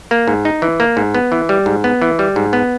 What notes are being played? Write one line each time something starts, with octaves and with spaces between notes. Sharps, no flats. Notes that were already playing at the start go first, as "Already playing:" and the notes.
A#3
G#2
D#4
E3
A#3
G#2
B3
E3
G3
G#2
B3
E3
G3
G#2
B3